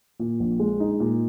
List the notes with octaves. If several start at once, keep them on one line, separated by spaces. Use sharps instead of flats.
A#2
A#1
G#3
D#4
A#2